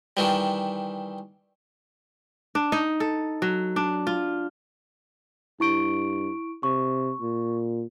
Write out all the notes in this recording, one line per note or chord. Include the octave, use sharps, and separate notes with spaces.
D#3 E3 G3
D4
D#4
A4
F#3
D4
F4
G2 E4 C#6 D7
C3 C#6
A#2